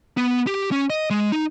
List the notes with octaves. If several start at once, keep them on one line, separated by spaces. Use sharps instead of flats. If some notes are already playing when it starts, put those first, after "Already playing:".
B3
G4
C#4
D#5
G#3
D#4